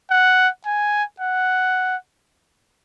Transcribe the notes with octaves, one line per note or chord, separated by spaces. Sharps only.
F#5
G#5
F#5